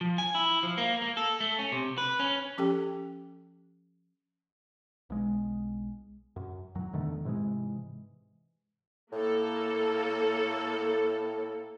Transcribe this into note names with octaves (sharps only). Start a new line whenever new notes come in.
F3
G#5
E4
F3
A#3
A#3
A4
A3
C#4
C3
B4
C#4
F3 C#4 G4 A4 G5
B1 G#3
F#2
D1 F#2 F#3
E2 D3 D#3 A3
G#2 C3 E3 G#3
A2 A#3 A4